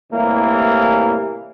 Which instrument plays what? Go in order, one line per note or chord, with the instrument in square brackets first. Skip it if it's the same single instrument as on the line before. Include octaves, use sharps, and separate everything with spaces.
[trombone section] C2 A2 E3 G3 A#3